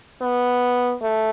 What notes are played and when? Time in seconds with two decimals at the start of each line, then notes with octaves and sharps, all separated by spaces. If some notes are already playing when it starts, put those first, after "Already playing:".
0.21 B3
1.02 A3